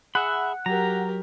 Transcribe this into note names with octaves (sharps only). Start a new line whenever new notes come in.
G#4 E5 F#5 B5
F#3 G4 A#4 A#5